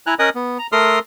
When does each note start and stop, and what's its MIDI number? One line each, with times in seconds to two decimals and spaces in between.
0.07 0.14 64
0.07 0.14 80
0.07 0.14 82
0.07 0.14 90
0.19 0.30 61
0.19 0.30 70
0.19 0.30 75
0.19 0.30 80
0.19 0.30 87
0.19 0.30 90
0.35 0.58 59
0.59 0.67 82
0.72 0.99 57
0.72 0.99 69
0.72 0.99 70
0.72 0.99 84
0.72 0.99 87
0.72 0.99 89